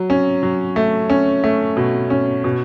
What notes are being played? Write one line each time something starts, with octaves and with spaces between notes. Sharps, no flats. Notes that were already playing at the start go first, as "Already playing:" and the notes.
Already playing: F#3
C#4
F#3
A3
C#4
A3
B2
C#4
B2